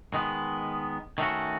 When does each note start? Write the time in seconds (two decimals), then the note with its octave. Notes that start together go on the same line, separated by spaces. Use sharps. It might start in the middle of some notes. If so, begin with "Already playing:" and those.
0.14 D#3 G#3 B3
1.18 D#3 A3 C#4 F#4